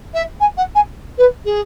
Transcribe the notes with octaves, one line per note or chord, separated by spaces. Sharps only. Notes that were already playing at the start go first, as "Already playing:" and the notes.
E5
G#5
F#5
G#5
B4
G#4